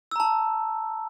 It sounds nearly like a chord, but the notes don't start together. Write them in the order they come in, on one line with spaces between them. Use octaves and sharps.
E6 A#5 A5